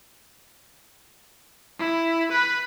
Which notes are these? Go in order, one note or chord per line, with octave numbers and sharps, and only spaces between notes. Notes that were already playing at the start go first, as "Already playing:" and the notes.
E4
B4